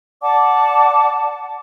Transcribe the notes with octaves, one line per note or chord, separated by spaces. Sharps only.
D5 F#5 A5 D6